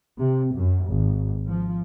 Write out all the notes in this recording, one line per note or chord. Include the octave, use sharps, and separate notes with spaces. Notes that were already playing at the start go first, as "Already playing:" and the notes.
C3
F#2
G#1
F3